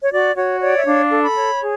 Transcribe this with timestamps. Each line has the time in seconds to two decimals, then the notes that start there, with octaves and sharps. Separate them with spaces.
0.02 C#5
0.12 F#4 D5
0.36 F#4 C#5
0.61 C#5 D5
0.78 E5
0.86 D4 F5
1.11 A4
1.24 B5
1.36 C#5
1.61 G#4